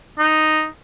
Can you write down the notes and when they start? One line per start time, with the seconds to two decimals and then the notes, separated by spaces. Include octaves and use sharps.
0.18 D#4